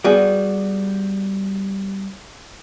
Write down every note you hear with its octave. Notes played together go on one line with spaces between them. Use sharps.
G3 B3 F#4 G#4